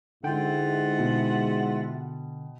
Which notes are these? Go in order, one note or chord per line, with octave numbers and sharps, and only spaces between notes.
G#2 D3 G#3 E4 F4 E5 F#5 G5
B2